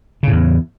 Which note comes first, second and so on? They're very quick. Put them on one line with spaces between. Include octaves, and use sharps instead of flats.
C#3 A2 E2